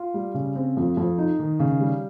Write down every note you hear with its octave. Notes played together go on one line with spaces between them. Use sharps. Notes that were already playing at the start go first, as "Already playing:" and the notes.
Already playing: F4
G3
C#3
C4
F2
F2
D#4
D#3
C#3
G3